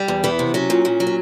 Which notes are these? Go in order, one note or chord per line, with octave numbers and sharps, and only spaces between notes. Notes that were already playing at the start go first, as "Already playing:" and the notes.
Already playing: G3
E2
E3 B3
C3
F#3 C#4
A#2
A#2
F#3
C#4